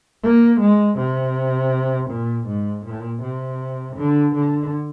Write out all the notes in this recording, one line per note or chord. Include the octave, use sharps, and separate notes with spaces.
A#3
G#3
C3
A#2
G#2
A#2
C3
D3
D3